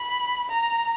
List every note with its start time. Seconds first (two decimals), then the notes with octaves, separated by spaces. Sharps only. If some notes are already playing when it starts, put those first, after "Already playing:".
Already playing: B5
0.49 A#5